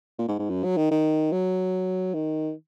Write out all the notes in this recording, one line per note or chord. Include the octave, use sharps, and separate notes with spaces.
A#2
G#2
G#2
F#2
F#3
D#3
D#3
F#3
D#3